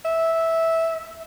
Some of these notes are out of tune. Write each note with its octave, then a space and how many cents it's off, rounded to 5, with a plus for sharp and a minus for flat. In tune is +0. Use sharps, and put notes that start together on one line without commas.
E5 -10